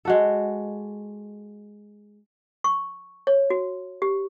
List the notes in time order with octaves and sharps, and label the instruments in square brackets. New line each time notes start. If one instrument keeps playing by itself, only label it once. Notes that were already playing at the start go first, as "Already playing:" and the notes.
[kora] G#3 F#4 A4
[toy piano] C#6
C#5
F#4
G4